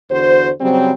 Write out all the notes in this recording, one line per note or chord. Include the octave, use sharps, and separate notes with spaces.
E2 D3 F#4 C5
C#3 F#3 G3 C4